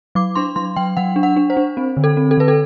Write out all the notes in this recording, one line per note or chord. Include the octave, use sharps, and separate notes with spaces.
F#3 D6
D4 C6
F#3 C6
F#3 G5
F#3 F#5
D4
F#5
D4
C5
D4
C4
D3
A4
C4
A4
D3 B4
A4